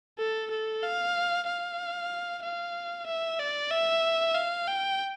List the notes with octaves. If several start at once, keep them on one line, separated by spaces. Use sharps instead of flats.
A4
A4
F5
F5
F5
E5
D5
E5
F5
G5